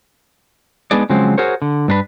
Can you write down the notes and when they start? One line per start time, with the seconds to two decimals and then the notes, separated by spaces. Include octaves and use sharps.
0.91 G#3 B3 D4 D#4 G#4 D5
1.09 C#3 F3 F#3 G#3 C4
1.38 F#4 G#4 A#4 C5 C#5
1.62 D3
1.88 G2 D4 B4